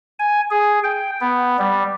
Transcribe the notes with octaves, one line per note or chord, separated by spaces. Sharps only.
G#5
G#4
G5
B3
G3